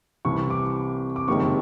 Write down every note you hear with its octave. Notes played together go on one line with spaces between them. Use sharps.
C2 C3 E3 C#6
D6
D6
F#1 F2 C3 D#3 G#3 C#6